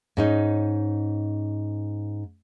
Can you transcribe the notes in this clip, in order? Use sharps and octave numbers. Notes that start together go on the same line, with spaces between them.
G#2 C#4 D#4